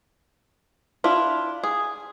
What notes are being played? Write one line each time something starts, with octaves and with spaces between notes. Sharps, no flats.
D4 E4 F4
G#4